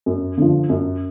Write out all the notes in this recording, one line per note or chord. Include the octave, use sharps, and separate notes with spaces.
F#2
D3 F3
F#2